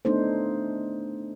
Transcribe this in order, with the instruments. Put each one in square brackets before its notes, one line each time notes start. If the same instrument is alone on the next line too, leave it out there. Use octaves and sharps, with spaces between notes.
[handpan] A3 B3 D4 D#4 A4 C5